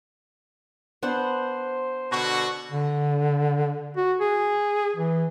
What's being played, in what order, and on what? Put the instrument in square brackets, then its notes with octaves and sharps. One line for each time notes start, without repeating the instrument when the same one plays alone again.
[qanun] B3 D4 F#5 [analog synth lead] C5
[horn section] B2 D3 F#4
[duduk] D3
F#4
G#4
E3